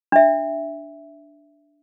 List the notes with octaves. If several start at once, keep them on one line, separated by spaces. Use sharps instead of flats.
D4 E5